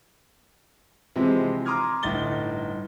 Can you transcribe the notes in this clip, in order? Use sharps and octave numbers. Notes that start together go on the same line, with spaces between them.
C3 E3 F3 G#3 C4
A#5 C6 D6 D#6 F6 G#6
G1 A2 D#4 A6 G7